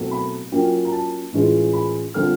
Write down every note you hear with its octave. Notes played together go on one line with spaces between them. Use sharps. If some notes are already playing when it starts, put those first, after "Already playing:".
Already playing: B2 F#3 A3 C4 E4
B5
F#3 A#3 C#4 F4 G5
A#5
A5
A2 E3 G#3 C#4 F4
B5
D3 G3 C4 F4 F6